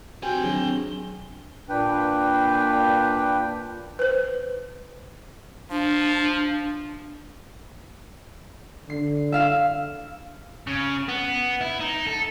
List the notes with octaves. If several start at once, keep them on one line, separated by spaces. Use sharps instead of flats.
C4 F#4 G4 B4 G5 G#5
D#3 F#3 D4 G#4 G7
A#2 D4 B4 G5
B4 C5
F3 D4
D3 C7
E5 F5 E6
C#3
B3
E4
D#4
A4